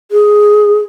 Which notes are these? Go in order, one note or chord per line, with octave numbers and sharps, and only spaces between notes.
G#4